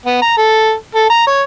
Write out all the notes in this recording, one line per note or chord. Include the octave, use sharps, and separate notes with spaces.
B3
A#5
A4
A4
A#5
C#5